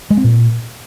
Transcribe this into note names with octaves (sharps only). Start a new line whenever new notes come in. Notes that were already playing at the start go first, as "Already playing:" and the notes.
G#3
C4
A#2